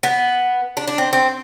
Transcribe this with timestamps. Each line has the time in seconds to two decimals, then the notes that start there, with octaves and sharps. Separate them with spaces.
0.03 B3
0.77 D4
0.88 D4
0.98 C4
1.13 C4